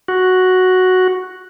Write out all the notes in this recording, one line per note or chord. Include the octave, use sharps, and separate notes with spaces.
F#4